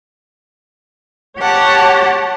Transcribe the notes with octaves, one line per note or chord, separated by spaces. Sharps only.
G4 C#5 F#5 A5